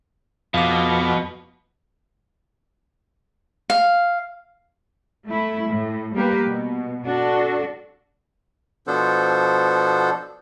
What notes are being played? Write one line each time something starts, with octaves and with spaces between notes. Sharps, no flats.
F2 B2 F5 D6
F5
A3 E4
A2
G3 A#3 G4 B4
B2
D4 F#4 A4
B2 F3 B3 D4 A4 C5